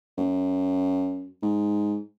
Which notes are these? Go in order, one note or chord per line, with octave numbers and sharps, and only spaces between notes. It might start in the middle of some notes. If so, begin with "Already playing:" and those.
F#2
G#2